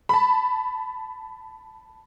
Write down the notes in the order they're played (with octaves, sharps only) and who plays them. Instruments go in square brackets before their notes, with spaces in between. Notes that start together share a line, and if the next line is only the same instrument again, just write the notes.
[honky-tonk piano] A5 B5